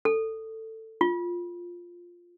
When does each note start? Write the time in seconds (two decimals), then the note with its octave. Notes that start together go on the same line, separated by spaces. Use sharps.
0.05 A4
1.01 F4